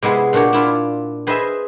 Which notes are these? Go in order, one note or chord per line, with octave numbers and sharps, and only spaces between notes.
C3 G#3 B3 E4 G#4
A#2 D4 F#4 G4 C#5
D4 E4 F4
G#4 B4 C5 D#5 E5 G#5